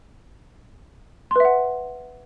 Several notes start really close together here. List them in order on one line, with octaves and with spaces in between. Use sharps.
C6 B4 E5 F#5